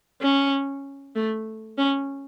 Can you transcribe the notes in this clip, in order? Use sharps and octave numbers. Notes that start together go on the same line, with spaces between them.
C#4
A3
C#4